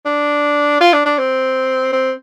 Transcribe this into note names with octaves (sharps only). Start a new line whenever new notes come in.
D4
F4
D4
D4
C4
C4